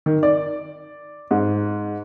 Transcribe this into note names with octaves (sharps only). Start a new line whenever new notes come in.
D#3
D5
G#2